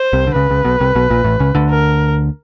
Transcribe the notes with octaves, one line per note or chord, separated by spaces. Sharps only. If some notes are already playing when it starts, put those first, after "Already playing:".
Already playing: C5
C2 C3
D3
C#2 C#3 B4
C#2 C#3
B1 B2
C2 C3
B1 B2
A#1 A#2
A1 A2
C#2 C#3
D2 D3
A#4